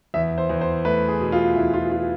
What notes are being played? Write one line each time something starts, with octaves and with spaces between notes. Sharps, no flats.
E2 E5
C5
E2
C5
A3 B4
G#4
B2
F4
E2 E4
F4
F4